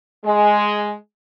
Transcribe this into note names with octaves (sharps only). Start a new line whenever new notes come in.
G#3